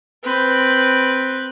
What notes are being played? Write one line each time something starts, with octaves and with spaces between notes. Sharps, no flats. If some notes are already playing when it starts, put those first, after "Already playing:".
C4 B4